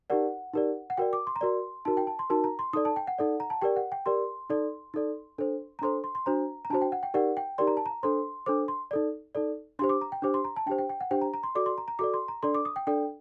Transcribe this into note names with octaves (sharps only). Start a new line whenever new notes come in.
D#4 G4 A#4 D5 F#5
D#4 G4 A#4 D5
F#5
F#4 A#4 D5 G5
D6
C6
A#5
F#4 A#4 D5 C6
D#4 F#4 A#4 A5
G5
A5
C6
D#4 F#4 A#4 A5
A#5
C6
D#4 A4 D5 D#6
A5
G5
F#5
D#4 A4 D5
A#5
A5
G4 A#4 D5 G5
F#5
G5
G4 A#4 D5 C6
D#4 A4 D5
D#4 A4 D5
D4 A4 C5
A#5
D4 A4 C5 C6
C6
C6
D4 F#4 C5 A#5
A#5
D4 F#4 C5 A5
G5
F#5
G5
D#4 G4 A#4 D5 F#5
G5
D#4 G4 A#4 D5 C6
A#5
A5
A#5
D4 A4 C5 C6
D4 A4 C5 D6
C6
D#4 A4 D5
D#4 A4 D5
D4 G4 C5 C6
D6
A#5
G5
D4 G4 C5 D6
C6
A#5
A5
D4 G4 C5 G5
G5
G5
F#5
D4 G4 C5 G5
A#5
A#5
C6
F#4 A4 D5 D6
C6
A#5
A#5
F#4 A4 D5 D6
C6
A#5
D4 A4 D5 C6
D6
D#6
G5
D4 A4 D5 G5